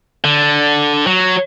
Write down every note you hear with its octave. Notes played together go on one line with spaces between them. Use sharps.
D3
F#3